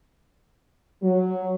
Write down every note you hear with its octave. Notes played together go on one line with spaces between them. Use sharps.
F#3